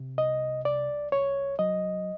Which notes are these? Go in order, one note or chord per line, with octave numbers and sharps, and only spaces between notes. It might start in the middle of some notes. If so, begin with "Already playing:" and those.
Already playing: C3
C2 D#5
C2 D5
C2 C#5
F#3 D#5